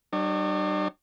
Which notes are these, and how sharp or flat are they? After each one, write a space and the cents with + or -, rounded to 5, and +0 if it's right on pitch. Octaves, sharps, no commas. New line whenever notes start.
G3 -35 D4 +45 C#5 +0